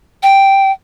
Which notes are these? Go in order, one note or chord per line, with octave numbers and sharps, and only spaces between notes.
G5